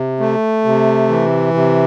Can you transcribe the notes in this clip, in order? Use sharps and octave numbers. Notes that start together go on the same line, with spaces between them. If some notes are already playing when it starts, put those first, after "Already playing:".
Already playing: C3
A3
C3
E3
C3